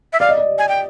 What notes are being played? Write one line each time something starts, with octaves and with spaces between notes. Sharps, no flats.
E5
D5 F5
D#5
D5
G#5
G5